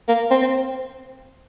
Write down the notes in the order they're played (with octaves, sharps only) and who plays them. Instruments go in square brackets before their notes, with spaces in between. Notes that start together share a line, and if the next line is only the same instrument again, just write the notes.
[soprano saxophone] A#3
C4
C4